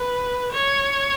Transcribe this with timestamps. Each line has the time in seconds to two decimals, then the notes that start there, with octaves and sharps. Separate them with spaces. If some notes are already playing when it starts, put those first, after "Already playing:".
Already playing: B4
0.52 C#5